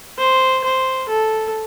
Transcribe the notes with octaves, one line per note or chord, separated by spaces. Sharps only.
C5
C5
A4